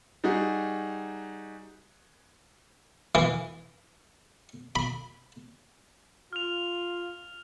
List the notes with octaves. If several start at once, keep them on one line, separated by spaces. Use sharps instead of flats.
G3 D#4 F#4 G#4
E3
B5
F4 F6 F7